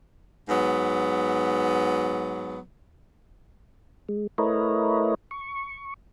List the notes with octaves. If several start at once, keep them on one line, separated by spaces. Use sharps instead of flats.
G#2 F#3 B3
G#3
A3 E4 A#4 B4 C#5 D#5
C#6